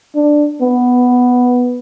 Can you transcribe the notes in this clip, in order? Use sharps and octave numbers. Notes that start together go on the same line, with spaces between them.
D4
B3